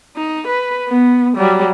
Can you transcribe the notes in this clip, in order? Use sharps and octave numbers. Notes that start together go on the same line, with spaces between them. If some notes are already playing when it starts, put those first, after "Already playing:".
D#4
B4
B3
F#3 G3